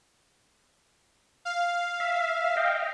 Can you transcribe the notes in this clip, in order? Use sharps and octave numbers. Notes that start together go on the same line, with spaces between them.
F5
E5
D#5 F5 G5